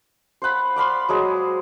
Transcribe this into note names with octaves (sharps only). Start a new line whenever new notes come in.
C5 F5 F#5 B5
D5 F5 B5 C6
F#3 G#3 G#4 C5